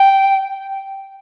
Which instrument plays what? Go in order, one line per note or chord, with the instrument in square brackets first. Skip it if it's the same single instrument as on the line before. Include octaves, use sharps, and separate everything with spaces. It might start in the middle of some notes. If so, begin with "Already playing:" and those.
Already playing: [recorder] G5